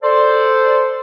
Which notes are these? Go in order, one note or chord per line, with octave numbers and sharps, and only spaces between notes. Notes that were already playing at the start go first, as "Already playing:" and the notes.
A4 C5 D5 C6